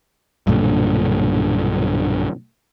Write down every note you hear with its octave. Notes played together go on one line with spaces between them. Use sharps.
B1 G2 A#2 D3